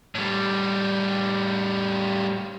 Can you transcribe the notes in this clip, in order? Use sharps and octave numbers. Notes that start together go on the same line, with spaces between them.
A2 G3